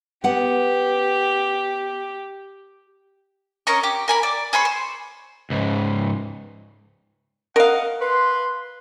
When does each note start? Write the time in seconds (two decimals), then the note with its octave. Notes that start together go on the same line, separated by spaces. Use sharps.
0.24 B3 G4 F#5
3.67 C#4 A#4 D#5 C#6
3.83 G4
4.08 A#4 G#5 B5
4.23 D5
4.53 G#4 C5 B5 C#6
4.65 C5
5.50 C#2 G#2
7.56 A#4 D#5 F5 F#5
8.01 B4 C6